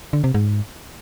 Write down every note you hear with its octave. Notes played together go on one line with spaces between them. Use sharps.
D3
C3
G#2